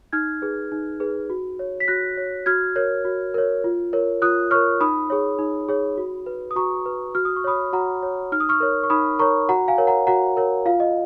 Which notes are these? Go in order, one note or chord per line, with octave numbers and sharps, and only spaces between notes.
D#4 F6 G#6
G#4 B4
D#4
G#4 B4
F#4
C#5
B6
F#4 F#6 A#6
C#5
F#4 F6 G#6
A#4 C#5
F#4
A#4 C#5
F4
A#4 C#5
F4 D#6 F#6
A#4 C#5 C#6 F6
D#4 B5 D#6
G#4 C#5
D#4
G#4 C#5
F#4
B4
D#6
F#4 A#5 C#6
B4
F#4 F6
D#6
C#6
C#5 B5 D#6
F#4 F#5 A#5
C#5
D#4 F6
D#6
C#6 F6
A#4 C#5
C#6
D#4 B5 D#6
A#4 C#5 A#5 C#6
F#4 F#5 A#5
F5 G#5
A#4 C#5
F#5 A#5
F#4 F#5 A#5
A#4 C#5
F4 F5
D#5